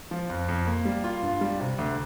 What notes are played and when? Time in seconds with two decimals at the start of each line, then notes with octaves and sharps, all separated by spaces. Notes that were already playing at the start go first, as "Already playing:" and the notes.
0.11 F3
0.30 F2
0.49 F2
0.67 A#3
0.85 G3
1.04 F4
1.23 G2
1.41 G3
1.60 C3
1.78 D2